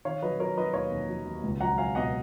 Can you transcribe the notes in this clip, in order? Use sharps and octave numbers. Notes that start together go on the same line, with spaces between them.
D#3 C#5 F5
F#3 B4 D#5
F#3 A#4 C#5
F#3 B4 D#5
D#2 C#5 F5
D#2
F#3
D#2
C#2
F#3 F#5 A#5
F#3 F5 G#5
B2 D#5 F#5